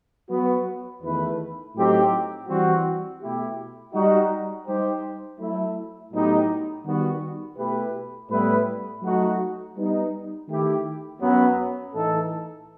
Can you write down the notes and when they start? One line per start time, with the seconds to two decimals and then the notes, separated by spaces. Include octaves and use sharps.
0.29 F#3 B3 F#4
1.02 E2 D#3 A3 E4 B4
1.75 A2 F#3 C4 D#4 G4
2.48 E3 G3 C4 F#4
3.21 B2 A3 E4 G4
3.93 G3 D#4 F#4
4.67 G3 D#4 G4 C5
5.39 F#3 A3 E4
6.12 A2 F#3 B3 D#4 G4
6.85 D#3 G3 B3 F#4
7.57 B2 A3 E4 G4 B4
8.30 A2 G3 B3 E4 B4
9.02 F#3 A3 D#4 F#4
9.76 G3 B3 D#4
10.49 D#3 A3 E4 G4
11.21 F#2 F#3 B3
11.94 A2 E3 A3 D#4 A4